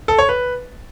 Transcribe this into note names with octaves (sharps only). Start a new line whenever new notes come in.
A4
C#5
B4